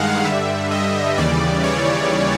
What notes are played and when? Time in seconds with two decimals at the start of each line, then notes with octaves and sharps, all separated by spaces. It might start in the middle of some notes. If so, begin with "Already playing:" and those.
Already playing: G2 D#3 G#3 F5 F#5
0.25 G2 D3 G3 E5
0.71 D#5
1.18 D#2 C#3 E3 G3 D5
1.63 C#5